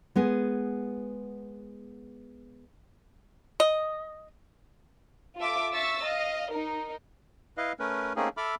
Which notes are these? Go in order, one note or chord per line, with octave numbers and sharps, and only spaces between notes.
G#3 B3 G#4
D#5
F4 A4 E5 D6
E5 C#6 E6 A6
D#5 F5
D#4 A#4
E4 B4 D#5 F5
A3 C#4 A#4 B4
A3 A#3 C4 C#4 D#4 G#4
A4 E5 B5 D6 F6